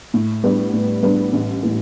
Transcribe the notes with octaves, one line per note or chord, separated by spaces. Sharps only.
A2
G3 B3 D4
A2
G3 B3 D4
A1
A2 E3